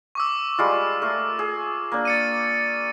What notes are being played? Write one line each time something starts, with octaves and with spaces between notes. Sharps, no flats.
C#6 D6 E6
G3 G#3 F4
A3 A#4
G#4
A#3 D4
A6 C#7 D#7